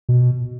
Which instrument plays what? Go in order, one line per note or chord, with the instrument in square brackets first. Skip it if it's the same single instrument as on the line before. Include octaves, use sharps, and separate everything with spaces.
[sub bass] B2